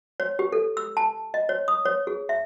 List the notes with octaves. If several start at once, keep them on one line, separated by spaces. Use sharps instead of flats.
C#5
G4
A4
E6
A5
D#5
C#5
D#6
C#5
G#4
E5